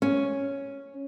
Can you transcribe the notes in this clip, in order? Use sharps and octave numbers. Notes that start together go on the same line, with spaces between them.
C#4